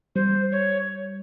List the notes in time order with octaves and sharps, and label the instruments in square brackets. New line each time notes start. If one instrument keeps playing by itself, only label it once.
[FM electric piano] G3 [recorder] C5
[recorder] C#5